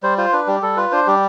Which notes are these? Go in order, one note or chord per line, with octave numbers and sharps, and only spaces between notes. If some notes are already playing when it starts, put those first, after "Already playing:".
G3 C5
F4 C5
D4 B4
G3 G4
G3 A4
F4 B4
D4 C5
G3 G4